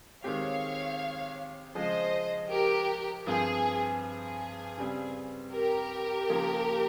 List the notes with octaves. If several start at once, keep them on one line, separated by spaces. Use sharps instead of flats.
D#3 G#3 C4 G4 C#5 F5
C#3 F3 G#3 C5 D#5
G4 A#4
G2 F3 C4 G#4
G#4
C#3 G3 C4
G4 A#4
C#3 F3 A#3